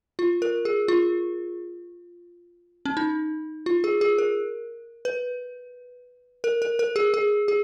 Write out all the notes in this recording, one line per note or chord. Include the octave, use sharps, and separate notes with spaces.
F4
A#4
G#4
F4
C#4
D#4
F4
G#4
G#4
A#4
B4
A#4
A#4
A#4
G#4
G#4
G#4